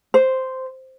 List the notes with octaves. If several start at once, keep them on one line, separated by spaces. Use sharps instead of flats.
C5